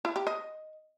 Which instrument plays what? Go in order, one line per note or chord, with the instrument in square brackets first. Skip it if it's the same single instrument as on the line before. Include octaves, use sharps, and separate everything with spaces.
[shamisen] E4
G4
D#5